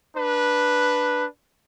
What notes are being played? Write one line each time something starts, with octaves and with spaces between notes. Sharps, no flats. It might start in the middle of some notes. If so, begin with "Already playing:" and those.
D4 B4